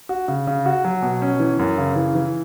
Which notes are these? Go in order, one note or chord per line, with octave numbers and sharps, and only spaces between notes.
F#4
C#3
C#3
F#4
F#3
B2
C#4
E3
F#2
C#3
E3
E3